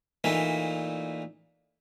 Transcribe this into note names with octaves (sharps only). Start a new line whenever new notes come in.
A#2 E3 A3 D#4